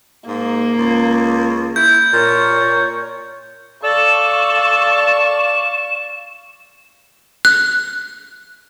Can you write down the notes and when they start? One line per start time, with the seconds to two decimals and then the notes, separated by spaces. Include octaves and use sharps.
0.28 G#2 A#3
0.77 C#2
1.76 E4 G6
2.13 A#2 C#5
3.84 A4 D5 F5 C#6 E7
7.45 F#6